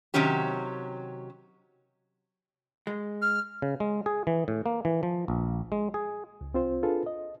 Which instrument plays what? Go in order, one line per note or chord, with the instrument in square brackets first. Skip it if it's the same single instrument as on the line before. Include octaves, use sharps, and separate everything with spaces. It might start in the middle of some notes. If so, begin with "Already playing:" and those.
[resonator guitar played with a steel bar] C3 D#3 F#3 C#4 G4
[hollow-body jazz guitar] G#3
[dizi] F6
[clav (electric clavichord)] C#3
G#3
G#4
E3
A2
A#3
E3
F3
A#1
G#3
G#4
[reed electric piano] C#2
C2 C4 F4 C5
D4 F4 G#4 A4 B4
D#5